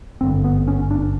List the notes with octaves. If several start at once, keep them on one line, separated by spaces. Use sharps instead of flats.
G#1 G2 D3 C4
B3
C#4
D4